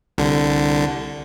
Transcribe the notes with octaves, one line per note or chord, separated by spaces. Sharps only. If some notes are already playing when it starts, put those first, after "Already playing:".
C2 D3